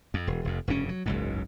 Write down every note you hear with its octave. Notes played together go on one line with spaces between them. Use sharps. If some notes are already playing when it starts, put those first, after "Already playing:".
F2
E1
F1 F2
F1 G2 C#3 C#4
F#3
F#1 C#2 G#2